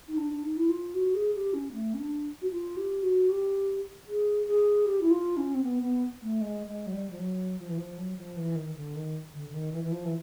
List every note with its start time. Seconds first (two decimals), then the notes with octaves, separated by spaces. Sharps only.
0.09 D#4
0.17 D4
0.31 D4
0.43 D#4
0.57 E4
0.69 F4
0.94 F#4
1.15 G#4
1.34 G4
1.54 C#4
1.73 A3
1.94 C#4
1.99 D4
2.42 F#4
2.51 F4
2.77 G4
3.03 F#4
3.29 G4
4.07 G#4
4.46 G#4
4.86 G4
5.01 E4
5.11 F4
5.37 C#4
5.54 C4
5.63 B3
5.83 B3
6.22 A3
6.41 G#3
6.67 G#3
6.87 F#3
6.93 G3
7.10 F3
7.19 F#3
7.59 F3
7.69 E3
7.78 F3
7.98 F#3
8.17 F3
8.37 E3
8.56 D#3
8.75 D3
8.96 D#3
9.34 D3
9.49 D3
9.54 D#3
9.73 E3
9.84 E3
9.92 F3
10.05 E3